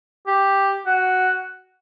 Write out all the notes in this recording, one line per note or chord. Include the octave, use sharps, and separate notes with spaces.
G4
F#4